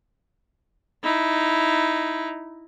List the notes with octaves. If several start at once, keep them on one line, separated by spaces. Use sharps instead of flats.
D#4 E4